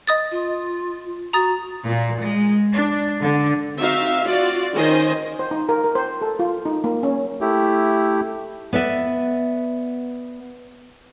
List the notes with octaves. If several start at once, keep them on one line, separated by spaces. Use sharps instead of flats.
D#5 D#6 A6
F4
F#4 A#5 D#6 A6
A#2
G#3
D4
D3
C4 D#4 F#4 E5 F5
F4 F#4 D5
D#3 C#4 C5 D#5 G#5
C5
D#4
A#4
A#4
C5
A4
F4
D#4
A#3
C#4
A3 E4 G4
B3 B4 D5 E5